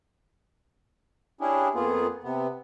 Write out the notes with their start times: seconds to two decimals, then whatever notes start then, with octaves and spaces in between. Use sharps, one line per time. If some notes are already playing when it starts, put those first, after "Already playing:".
1.41 C#4 D4 E4 G4 G#4
1.75 F2 A#3 B3 F4 G#4
2.24 C3 B3